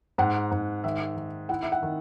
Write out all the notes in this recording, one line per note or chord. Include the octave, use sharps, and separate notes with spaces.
G#2 F#5
G#2
D#3 E5
D#3
E4 F#5
E5
F#5
D#3